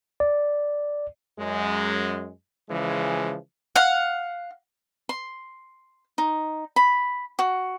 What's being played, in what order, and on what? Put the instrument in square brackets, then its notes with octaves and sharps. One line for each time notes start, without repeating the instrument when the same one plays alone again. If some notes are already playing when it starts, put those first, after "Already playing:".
[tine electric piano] D5
[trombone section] F#2 G#3
C#3 E3 F3 G#3
[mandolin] F5 F#5
[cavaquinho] C6
D#4
B5
F#4